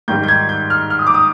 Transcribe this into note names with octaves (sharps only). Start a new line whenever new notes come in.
G#2 D#3 G3 G6
G6
G#6
G6
F6
F6
D#6
D6
D#6